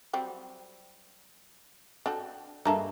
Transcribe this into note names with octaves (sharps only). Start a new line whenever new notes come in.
F#3 G3 C4
D4 F#4 A4 G5
G2 G#3 A#3 A4 E5 A5 A#5